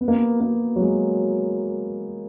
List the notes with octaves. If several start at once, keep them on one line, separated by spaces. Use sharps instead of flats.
B3
A#3
B3
A#3
F#3
G#3